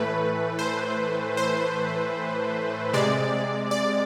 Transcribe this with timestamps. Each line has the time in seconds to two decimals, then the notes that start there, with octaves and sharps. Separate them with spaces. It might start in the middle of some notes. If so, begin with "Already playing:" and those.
Already playing: A2 E3 A3 B4
0.59 C5
1.37 C5
2.93 C3 G#3 D5
3.71 D5